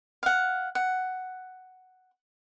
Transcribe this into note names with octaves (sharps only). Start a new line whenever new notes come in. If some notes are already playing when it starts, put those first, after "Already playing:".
F5 F#5
F#5